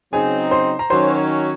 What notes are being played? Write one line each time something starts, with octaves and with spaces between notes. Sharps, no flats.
C#3 F#3 C4 D#4 G#4 G#5
C5 C6
A#5
D#3 F#3 C#4 C5 C6